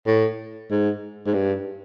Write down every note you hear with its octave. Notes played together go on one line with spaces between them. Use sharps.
A2
G#2
G#2
G2